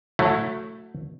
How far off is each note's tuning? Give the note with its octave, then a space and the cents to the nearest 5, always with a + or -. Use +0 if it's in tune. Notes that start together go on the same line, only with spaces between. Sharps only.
F#3 -15 A3 +10 E4 +0